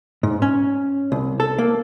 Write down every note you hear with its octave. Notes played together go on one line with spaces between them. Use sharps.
G#2
C#4
C2
A4
A#3